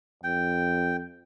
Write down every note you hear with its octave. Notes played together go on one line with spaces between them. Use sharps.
F2 G5